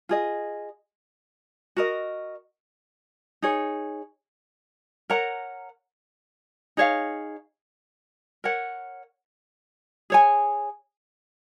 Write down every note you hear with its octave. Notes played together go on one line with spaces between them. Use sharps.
F4 G#4 D#5
F#4 A#4 D#5
D#4 G#4 C#5
A#4 C#5 F#5 A#5
D#4 G#4 C#5 F5
A#4 C#5 F#5
G#4 C#5 G#5